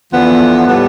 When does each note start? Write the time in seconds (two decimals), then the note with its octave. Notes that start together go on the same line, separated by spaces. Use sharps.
0.12 E2 D3 F3 B3
0.66 A2 G3 B3